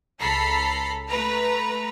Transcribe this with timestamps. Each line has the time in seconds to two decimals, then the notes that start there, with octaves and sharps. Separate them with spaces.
0.20 C#2 A4 A#5 B5 C7
1.09 A3 B4 A#5